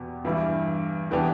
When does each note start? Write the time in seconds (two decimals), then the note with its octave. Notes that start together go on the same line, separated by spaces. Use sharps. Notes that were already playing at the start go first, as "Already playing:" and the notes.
Already playing: E2 B2 B3 G4
0.25 G2 E3 G3 E4
1.11 E3 B3 D4 G4